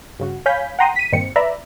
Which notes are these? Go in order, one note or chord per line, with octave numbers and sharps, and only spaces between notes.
G2 C#3 F#4
C#5 F5 G#5 B5 G6 B6
F#5 G5 A#5 C6 D#6
B6 D#7
G2 A#2 D#3 C4 C#7
B4 D5 E5 A#5 B5